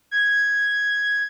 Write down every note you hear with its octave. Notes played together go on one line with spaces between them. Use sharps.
G#6